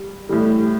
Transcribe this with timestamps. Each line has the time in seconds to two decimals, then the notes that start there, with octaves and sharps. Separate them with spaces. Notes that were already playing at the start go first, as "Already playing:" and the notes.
Already playing: G3
0.29 A2 E3 G3